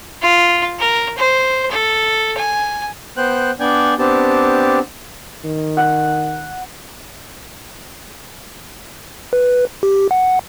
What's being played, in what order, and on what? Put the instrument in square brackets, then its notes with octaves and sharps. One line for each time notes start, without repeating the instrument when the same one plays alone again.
[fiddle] F4
A#4
C5
A4
G#5
[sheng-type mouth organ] B3 C5 G5 F#6
B3 D4 D5 G5 G#5
B3 C4 D4 G4 A5
[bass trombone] D#3
[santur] F#5
[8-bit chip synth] B4
G4
F#5